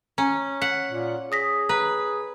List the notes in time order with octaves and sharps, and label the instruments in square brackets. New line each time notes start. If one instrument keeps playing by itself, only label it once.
[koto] C#4 [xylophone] A#5
[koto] F#5 [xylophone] B6
[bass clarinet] A#2
[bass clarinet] G#4 [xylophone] D#6 A#6 B6
[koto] B4 [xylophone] A#5